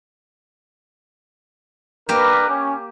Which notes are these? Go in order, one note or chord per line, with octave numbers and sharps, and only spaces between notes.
A#3 D4 G4 A#4 B4
C#4